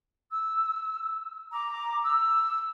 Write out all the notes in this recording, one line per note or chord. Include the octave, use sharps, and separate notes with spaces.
E6
A#5 D6
E6